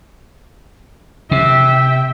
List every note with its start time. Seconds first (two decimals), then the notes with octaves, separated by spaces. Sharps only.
1.31 C3 E5 G5